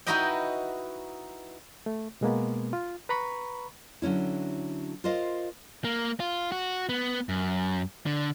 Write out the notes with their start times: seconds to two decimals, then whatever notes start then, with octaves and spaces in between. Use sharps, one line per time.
0.07 D#4 E4 F#4 B4 D#5 G5
1.86 A3
2.21 B2 G#3 A#3 B3
2.73 F4
3.09 B4 A#5 B5 C#6
4.02 D3 F#3 C#4 E4
5.04 F4 A#4 C5 D#5 F5
5.84 A#3
6.20 F4
6.52 F#4
6.89 B3
7.29 F#2
8.06 D3